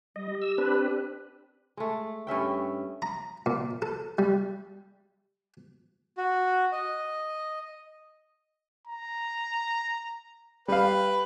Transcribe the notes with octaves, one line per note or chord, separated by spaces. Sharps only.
G3 D#5
G4
E6
C4 D4 B4
G#3 A3
G2 C#4 E5 G5
A#5
A#2
A4
G3
F#4
D#5
A#5
G3 B4 F5 G5